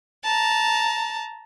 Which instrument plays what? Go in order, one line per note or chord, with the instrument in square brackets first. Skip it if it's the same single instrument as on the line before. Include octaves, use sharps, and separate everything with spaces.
[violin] A5 A#5